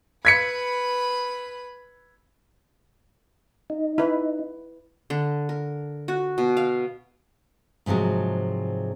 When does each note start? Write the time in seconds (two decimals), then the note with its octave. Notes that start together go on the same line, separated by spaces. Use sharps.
0.25 B4 B5 G#6 B6 C#7
3.70 D#4
3.98 E4 B4
5.10 D3
5.49 A#4
6.08 F#4
6.38 B2
6.57 F5
7.86 G#2 C3 F3 F#3 G#3